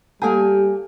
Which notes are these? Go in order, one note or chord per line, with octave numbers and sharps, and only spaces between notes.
G3 A#3 G4 A4 F#5 G#5 A5